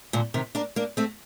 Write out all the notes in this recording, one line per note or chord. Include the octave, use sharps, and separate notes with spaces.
A#2 D3
C3 D#3
A#3 D4
A#3 D4
A3 C4